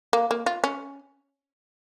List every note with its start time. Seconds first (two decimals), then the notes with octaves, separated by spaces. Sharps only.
0.13 A#3
0.31 A#3
0.46 F4
0.64 C#4